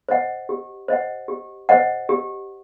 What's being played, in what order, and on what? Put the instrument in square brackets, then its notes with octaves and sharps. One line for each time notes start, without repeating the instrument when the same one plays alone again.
[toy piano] C5 D#5 F#5
G4
C5 D#5 F#5
G4
C5 D#5 F#5
G4